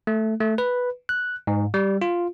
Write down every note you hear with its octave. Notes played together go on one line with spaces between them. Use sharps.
A3
A3
B4
F#6
G#2
G3
F4